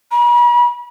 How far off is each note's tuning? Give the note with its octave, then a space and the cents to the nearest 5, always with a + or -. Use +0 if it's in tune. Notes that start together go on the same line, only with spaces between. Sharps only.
B5 -45